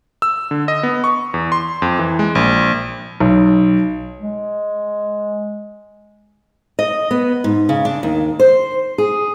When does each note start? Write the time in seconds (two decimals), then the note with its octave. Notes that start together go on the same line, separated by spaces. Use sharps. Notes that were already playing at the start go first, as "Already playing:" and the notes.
0.22 E6
0.51 D3
0.68 D#5
0.83 B3
1.04 C#6
1.34 E2
1.52 C6
1.82 F2
1.99 E3
2.19 G#3
2.35 A#1
3.20 B1
4.19 G#3
6.79 D#5
7.11 B3
7.44 G#2
7.69 C#3
7.85 D4
8.03 D#2
8.39 C5
8.98 G#4